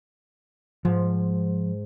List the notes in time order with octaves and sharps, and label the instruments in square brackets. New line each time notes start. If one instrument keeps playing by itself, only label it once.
[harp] G#2 [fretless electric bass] F3